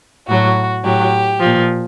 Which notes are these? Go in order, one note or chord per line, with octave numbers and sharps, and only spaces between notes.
A2 F#3 F#4
A2 F#3 G4
A#2 F3